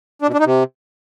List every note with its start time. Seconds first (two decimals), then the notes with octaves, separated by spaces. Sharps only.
0.22 D4
0.28 B2
0.34 D4
0.40 D#4
0.46 C3